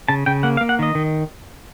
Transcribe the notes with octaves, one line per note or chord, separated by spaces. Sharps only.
C#3 A5
C#3 G5
A#3 F#5
F5
A#3
F#5
D#3 D#5
D#3